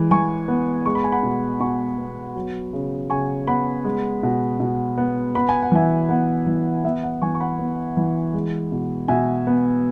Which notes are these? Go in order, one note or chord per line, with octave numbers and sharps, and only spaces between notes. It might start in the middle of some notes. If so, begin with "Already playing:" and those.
Already playing: E3 G#3
E3 G#5 C#6
B3
G#3 C#6
B5
G#5
F#5 B5
B2
B2 G#5 C#6
B3
F#3
C#3
C#3 G#5 C#6
B3 F#5 B5
G#3
B2
B2
B3
B3 B5
G#5
F#5
E3 E5 G#5
B3 F#5
E3
B3 E5
F#5
E3 G#5 C#6
C#6
F#5 B5
B3
E3
G#3
B2
B2 E5 G#5
B3